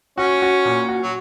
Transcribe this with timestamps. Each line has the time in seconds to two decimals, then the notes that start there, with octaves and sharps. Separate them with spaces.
0.18 C#4 F#4
0.42 F#4
0.65 A#2
0.88 F#4
1.03 F#3